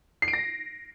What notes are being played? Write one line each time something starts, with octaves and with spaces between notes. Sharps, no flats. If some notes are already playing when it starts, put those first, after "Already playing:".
C7
D7
A#6